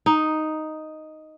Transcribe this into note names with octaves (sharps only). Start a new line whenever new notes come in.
D#4